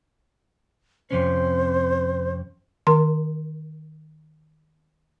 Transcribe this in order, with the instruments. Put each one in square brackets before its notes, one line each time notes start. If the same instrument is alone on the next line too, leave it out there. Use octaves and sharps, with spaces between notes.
[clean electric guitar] F2 C3 C#4 [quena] C5
[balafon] D#3 A#4 C6